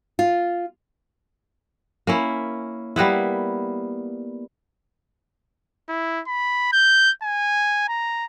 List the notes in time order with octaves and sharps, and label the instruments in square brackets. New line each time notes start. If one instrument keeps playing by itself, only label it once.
[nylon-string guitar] F4
[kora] A#3 C#4 E4
G3 A#3 B3 E4
[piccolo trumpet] E4
B5
G6
G#5
A#5